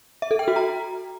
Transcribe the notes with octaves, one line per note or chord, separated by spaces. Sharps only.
E5
A4
G5
F#4
A#5